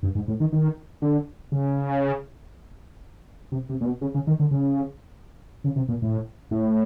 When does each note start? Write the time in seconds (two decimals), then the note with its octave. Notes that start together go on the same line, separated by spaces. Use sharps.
0.03 G2
0.15 G#2
0.28 A2
0.40 D#3
0.52 D#3
1.02 D3
1.52 C#3
3.52 C3
3.69 C3
3.81 A#2
3.85 B2
4.01 C#3
4.15 C#3
4.27 D#3
4.40 D3
4.51 C#3
5.64 C#3
5.76 C3
5.89 A#2
6.02 A2
6.51 A2